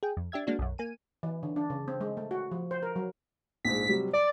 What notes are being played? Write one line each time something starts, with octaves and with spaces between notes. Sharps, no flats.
G#4 G5
F2
D4 G4 E5 G#6
G#3 A#3 D4 F#4
B1 F#2
A#3 G#5 D#7
E3
D3
D4
C#3
C4
G#3
A3
F#4
F3
C5
A#4
F#3
A#1 G#2 B6
C3 F#3 G3
D5 D6